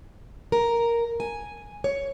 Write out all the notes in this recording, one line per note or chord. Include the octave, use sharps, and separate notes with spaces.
A#4
G#5
C#5